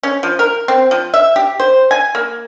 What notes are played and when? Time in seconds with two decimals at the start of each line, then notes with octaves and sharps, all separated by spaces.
0.03 C#4
0.23 F3
0.39 A#4
0.68 C4
0.91 F3
1.14 E5
1.36 G4
1.60 C5
1.91 G#5
2.15 A#3